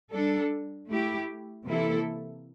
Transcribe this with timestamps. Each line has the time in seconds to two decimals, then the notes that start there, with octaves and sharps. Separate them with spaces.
0.10 G3 D4 A4
0.88 A3 E4 G4
1.66 C3 E3 A#3 E4 A4